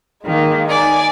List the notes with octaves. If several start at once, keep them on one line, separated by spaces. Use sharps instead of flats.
D#3 G#3 A#3
D#4 D5 G#5